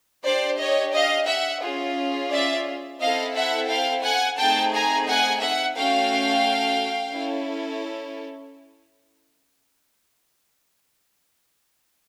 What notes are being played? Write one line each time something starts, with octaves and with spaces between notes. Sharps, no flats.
D4 G4 C5 D5
C#5 D#5
D#5 F5
E5 F#5
C#4 F4 G#4
D5 E5
C4 E4 A4 D#5 F5
E5 F#5
F5 G5
F#5 G#5
A3 C4 D#4 G#4 G5 A5
G#5 A#5
F#5 G#5
E5 F#5
A3 C#4 F#4 A4 F5 G5
C#4 E4 A4